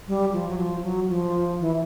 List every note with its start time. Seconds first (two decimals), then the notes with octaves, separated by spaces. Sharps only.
0.08 G3
0.33 F3
0.48 F#3
0.58 F3
0.83 F#3
1.09 F3
1.60 E3